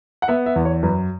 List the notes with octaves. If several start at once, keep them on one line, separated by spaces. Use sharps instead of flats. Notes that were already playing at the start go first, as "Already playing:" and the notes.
F#5
B3 E5
E5
E2
C#5
F#2 B4